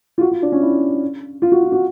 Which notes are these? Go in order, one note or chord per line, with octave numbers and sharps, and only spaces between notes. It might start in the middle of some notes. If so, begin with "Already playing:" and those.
F4
F#4
F4
D4
C#4
E4
F4
F#4
F4
F#4